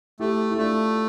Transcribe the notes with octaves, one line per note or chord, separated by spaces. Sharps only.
A3 E4 G4
E4
A3 D4 F4